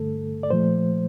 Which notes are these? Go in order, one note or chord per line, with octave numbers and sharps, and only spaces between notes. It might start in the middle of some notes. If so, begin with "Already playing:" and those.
Already playing: G2 D3 A3 A4
D5
A#2 F3 A3 C5